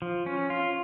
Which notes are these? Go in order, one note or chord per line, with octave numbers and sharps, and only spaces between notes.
F3
C#4
F4